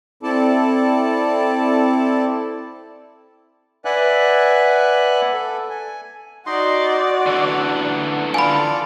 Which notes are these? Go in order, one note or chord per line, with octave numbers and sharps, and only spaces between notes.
C4 E4 A4 D5 A5
B4 D5 E5 F#5 G#5 F#6
A4
G#5
D#4 F#4 D5 D#5 C6
D3 E3 F#5
F4 A4 D5 G#5 B5